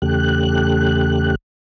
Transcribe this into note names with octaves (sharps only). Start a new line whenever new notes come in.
E2 C#3 A3 G4 F#6